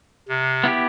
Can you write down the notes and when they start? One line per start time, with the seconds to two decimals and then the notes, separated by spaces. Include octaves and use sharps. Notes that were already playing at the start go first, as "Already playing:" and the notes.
0.29 C3
0.64 B3 E4 G4